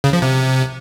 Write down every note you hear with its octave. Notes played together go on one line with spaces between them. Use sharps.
C#3
F3
C3